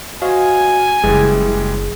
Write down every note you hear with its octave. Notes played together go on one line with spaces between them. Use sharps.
F#4 C5 D#5 F5 G#5
F#1 E3 G3 G#3 G#4